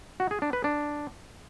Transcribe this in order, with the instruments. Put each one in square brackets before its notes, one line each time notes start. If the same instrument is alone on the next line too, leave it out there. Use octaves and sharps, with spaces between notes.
[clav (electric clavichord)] F#4
G#4
D4
B4
D4